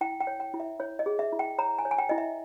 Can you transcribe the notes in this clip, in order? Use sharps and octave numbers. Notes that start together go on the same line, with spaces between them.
E4 G5
G5
C#5
G5
E4
E5
E4 C#5
D#5
G#4
E5
E4
G5
C#5 A#5
G#5
C#5
G#5
G5
E4 D#5
E5